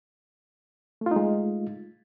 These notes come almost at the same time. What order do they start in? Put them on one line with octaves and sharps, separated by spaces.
A3 F4 D#4 G#3